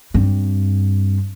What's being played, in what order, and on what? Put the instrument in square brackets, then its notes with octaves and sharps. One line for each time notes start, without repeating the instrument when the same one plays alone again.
[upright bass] G2 C4